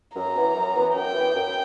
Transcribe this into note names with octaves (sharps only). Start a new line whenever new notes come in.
F#2 A#5
E3 B3
F#2
E3 B3
F#2 G5
E3 B3
F#2